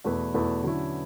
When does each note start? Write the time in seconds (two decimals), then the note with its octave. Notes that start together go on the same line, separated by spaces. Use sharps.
0.04 E2 B2 A3 E4 B4
0.34 E2 B2 A3 E4 B4
0.63 D3 F#3 C#4 E4